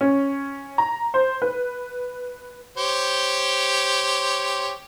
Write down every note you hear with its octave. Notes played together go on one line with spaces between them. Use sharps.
C#4
A#5
C5
B4
G4 C5 C#5